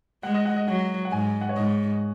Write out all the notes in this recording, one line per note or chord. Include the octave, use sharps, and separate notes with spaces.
G#3 F#5
D#5
F#5
D#5
F#3 F#5
F#5
G#2 G#5
F#5
C#5
G#2 D#5